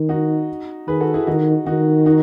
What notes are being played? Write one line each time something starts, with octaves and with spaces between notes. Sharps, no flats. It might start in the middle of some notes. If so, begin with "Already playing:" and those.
Already playing: D#3
D#4 F#4
D#3 G#4 B4
F#4 A4
E4 G#4
D#3 D#4 F#4
D#3 D#4 F#4
D#4 F#4